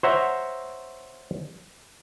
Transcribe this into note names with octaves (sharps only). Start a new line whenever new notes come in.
C5 C#5 E5 F#5 A#5